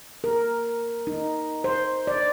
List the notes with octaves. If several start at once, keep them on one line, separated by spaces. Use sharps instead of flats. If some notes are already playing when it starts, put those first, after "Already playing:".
A#4
D#4
C5
D5